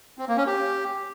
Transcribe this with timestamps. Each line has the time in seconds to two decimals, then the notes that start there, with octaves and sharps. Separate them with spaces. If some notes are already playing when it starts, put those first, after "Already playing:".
0.18 C4
0.28 A#3
0.37 C#4
0.47 G4